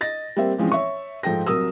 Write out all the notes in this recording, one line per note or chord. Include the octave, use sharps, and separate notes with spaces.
D#5 A6 A#6
G3 A#3 C4 E5
E3 F3 G#3 C4 C#4
C#5 E5 C#6
G#2 F3 A4 G5 A#6
C2 F#3 A#4 D#6 E6